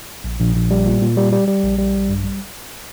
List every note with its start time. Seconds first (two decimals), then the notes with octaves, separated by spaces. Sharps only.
0.24 A#1
0.40 A#1
0.55 A#1
0.71 G3
0.86 A#2
1.01 A#2
1.17 G3
1.32 G3
1.47 G3
1.63 A#1
1.78 G3
1.94 A#1
2.09 G2
2.24 G3